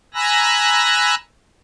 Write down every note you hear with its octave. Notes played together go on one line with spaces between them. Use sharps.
G#5 A#5 B5 E6 F#6 A#6